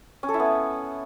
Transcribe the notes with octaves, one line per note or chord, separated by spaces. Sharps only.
C#4
A4
E4
B3